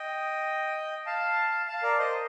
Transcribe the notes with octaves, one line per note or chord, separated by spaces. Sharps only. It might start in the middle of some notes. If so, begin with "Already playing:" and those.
Already playing: D#5 G5
F5 A5
F5 A5
A#4 D5
C5 D#5